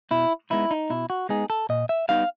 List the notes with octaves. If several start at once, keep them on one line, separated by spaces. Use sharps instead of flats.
B2 E4
G#3 B3 D#4 E4
D#4
B2 E4
F#4
G#3 B3 D#4 G#4
A4
A#2 D#5
E5
G3 B3 D#4 F5